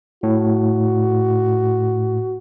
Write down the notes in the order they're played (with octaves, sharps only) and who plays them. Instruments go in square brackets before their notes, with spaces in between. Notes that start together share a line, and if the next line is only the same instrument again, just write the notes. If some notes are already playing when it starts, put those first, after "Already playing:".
[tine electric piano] A2 [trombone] F#4